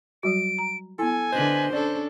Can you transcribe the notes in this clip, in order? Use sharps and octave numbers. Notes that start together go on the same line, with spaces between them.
F#3 G3 F#4 D7
A#5
B3 E4 A4 G#5
D3 B4 C5 D#5
C#4 D4 A4 D5